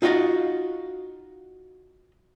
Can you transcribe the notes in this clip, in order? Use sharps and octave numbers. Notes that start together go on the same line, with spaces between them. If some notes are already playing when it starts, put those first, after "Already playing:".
D#4 F4 F#4 D#5 F5